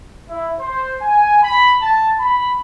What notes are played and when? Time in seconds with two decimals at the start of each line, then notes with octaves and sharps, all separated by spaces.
0.29 E4
0.60 C5
1.01 G#5
1.43 B5
1.82 A5
2.19 B5